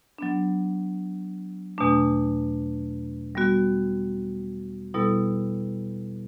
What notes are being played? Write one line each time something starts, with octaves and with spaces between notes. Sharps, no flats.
F#3 B3 D4
E2 B2 A3 D4
G3 B3 F#4
B2 G3 B3 E4 A4